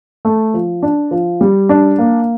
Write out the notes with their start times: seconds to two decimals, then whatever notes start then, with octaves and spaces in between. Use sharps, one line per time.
0.25 A3
0.54 F3
0.82 D4
1.11 F3
1.41 G3
1.69 D4
1.98 A#3